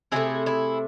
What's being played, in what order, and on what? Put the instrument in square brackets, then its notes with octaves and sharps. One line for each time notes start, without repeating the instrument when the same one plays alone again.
[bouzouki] C3 F#3 E4 G#4
A3
E4 G#4